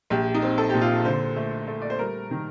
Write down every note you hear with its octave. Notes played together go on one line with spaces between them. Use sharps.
A#1 G4
D#4
C4
A4
A#2 G4
F4
D3 C5
A3
A3
D5
C5
G3 A#4
D#3